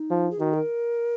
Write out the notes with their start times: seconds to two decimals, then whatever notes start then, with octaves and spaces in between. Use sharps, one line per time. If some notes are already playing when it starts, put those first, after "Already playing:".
Already playing: D#4
0.11 F3
0.31 G#4
0.39 D#3 F#4
0.54 A#4